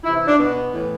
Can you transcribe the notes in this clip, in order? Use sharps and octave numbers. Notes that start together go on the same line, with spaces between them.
C3 E3 E4
E4
D4
B2 B3
A2 E3